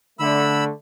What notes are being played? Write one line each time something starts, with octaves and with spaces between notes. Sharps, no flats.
D3 A3 B5 E6